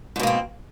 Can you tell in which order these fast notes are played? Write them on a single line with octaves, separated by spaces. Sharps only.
G#2 B2 A#3 C4